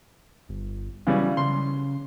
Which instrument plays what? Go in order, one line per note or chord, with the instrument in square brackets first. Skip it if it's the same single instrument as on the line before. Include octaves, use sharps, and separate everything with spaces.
[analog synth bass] G1
[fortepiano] C#3 E3 G3 [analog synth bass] F#3
[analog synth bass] C#3 [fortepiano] C6